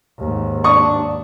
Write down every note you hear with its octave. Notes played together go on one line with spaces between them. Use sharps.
D#2 G#2
D4 C#6 D#6